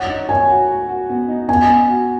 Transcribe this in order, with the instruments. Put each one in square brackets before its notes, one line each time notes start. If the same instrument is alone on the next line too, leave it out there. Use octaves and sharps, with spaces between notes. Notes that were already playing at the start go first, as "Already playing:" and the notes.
Already playing: [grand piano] C#5 [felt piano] F#5
[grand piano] D#4
[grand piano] C#5 [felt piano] G#5
[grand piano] F#4
F#4
F#4
B3
D#4
[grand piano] B3 [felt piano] G#5
[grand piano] B3
F#4